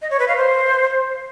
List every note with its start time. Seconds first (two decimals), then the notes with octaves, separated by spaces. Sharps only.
0.02 D#5
0.11 C#5
0.19 B4
0.28 F5
0.37 C5